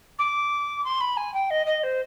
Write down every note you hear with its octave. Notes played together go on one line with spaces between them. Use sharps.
D6
C6
B5
G#5
G5
D#5
D#5
C5